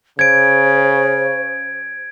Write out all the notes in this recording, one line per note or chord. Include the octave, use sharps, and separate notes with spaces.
C#3 C5 G#6 D7